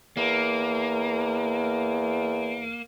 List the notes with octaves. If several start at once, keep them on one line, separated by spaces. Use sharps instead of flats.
E2 A#3